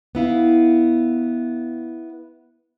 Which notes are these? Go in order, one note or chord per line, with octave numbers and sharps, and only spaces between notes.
B3 E4 F5